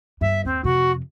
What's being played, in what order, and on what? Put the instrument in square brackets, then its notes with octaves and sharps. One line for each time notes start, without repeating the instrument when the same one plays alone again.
[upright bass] G1 G2 [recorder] E5
[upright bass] D#2 [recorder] C4
[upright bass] F2 C3 [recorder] F#4